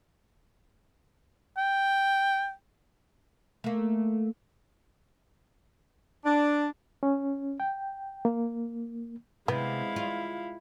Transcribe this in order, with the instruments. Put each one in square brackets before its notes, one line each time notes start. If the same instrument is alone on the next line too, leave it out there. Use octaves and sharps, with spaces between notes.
[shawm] G5
[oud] A3 A#3
[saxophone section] D4
[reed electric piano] C#4
G5
A#3
[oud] C3 [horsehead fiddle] G#3 F5 [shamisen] B3 [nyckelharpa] E4
[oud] F4